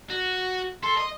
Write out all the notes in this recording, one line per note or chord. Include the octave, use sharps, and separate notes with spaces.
F#4
A4 C6
D#5